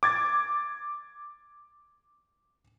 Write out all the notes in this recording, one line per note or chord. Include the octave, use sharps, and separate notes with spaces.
D6 G#6 A6